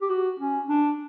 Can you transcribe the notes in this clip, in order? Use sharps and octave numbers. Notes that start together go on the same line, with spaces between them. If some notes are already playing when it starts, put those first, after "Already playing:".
G4
F#4
C#4
D4